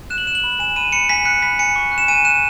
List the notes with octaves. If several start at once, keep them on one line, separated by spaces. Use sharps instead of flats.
F#6 E7
F#7
F#6 E7
F#7
B5
G#5 E7
B5 D#7
B5 C#7
G#5 B6
F#6 C#7
B5 B6
G#5 C#7
C#6
F#6
E7
G#5 D#7
F#6 E7